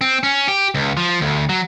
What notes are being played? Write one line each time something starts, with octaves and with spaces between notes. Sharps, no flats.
C4
C#4
G4
C#2
F3
D2
F#3